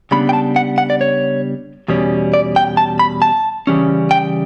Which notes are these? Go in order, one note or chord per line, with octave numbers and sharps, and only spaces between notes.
C#3 G3 B3 D4 B5
G5
A5
F#5
F#5
D5
C#5
E2 B2 G3 C#4
D5
G5
A5
B5
A5
C#3 E3 G3 C#4
G5